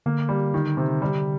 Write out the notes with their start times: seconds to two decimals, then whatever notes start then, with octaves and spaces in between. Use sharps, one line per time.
0.06 D3 A#3
0.29 G3
0.54 D#3
0.77 C3
1.02 G3